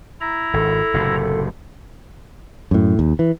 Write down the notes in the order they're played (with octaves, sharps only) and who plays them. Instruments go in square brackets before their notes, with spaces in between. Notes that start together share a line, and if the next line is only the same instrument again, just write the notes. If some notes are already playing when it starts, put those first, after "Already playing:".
[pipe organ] E4 A#5
[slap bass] G#1 [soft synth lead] A4
[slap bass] F#1 A2 C3
[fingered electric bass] F#2 A2
D#2
E3